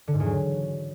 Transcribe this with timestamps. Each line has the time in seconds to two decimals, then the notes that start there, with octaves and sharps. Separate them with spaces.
0.08 D3
0.14 G#2
0.20 E2
0.26 F#3